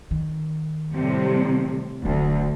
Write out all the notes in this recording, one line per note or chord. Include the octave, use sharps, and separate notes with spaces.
D#3
A2 C3 G3
D1 D2 D#4